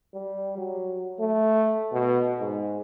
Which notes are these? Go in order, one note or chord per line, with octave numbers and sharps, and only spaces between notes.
G3
F#3
A3
B2
G#2